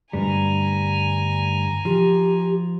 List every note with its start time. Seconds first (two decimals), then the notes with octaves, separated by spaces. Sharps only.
0.13 D2 G2 G3 G#5 A#5
1.85 F3 G4